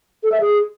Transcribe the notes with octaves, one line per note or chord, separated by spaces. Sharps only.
A4
E5
G#4